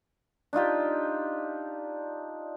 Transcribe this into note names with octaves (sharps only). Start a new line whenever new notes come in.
D4 D#4 F4 G4